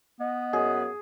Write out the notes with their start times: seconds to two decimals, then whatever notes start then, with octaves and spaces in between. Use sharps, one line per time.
0.20 B3 D#5
0.53 F#2 G#4